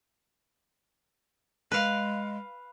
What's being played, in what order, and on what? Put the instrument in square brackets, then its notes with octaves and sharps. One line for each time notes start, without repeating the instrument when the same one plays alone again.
[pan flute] G#3 [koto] B4 F5